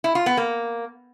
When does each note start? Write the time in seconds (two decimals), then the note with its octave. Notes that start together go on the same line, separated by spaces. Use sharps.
0.04 E4
0.15 F4
0.26 B3
0.37 A#3